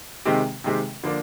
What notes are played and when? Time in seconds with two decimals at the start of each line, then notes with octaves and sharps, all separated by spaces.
0.25 C3 D#3 G#3 C4 G4
0.64 C3 D#3 G#3 C4 G4
1.03 D3 F3 A#3 D4